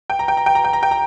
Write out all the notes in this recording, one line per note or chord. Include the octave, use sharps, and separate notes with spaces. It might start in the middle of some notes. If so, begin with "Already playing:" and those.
G5
A#5
G5
A#5
G5
A#5
G5
A#5
G5
A#5